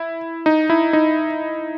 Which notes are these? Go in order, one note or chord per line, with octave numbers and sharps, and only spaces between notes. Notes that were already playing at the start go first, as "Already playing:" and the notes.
Already playing: E4
D#4
E4
D#4